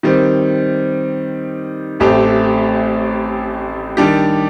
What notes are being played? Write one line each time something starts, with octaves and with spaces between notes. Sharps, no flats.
D#3 G3 C4
A1 A2 A3 C4 G4
D#3 G3 D4 G4